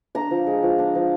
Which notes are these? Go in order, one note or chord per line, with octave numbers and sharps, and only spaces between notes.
D4 A#5
F3
G#3
F3
D4
F3